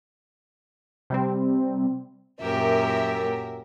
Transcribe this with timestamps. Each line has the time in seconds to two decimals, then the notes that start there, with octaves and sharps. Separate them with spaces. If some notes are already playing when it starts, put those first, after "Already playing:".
1.10 C3 G3 C4
2.42 F#2 A#2 G4 A#4 E5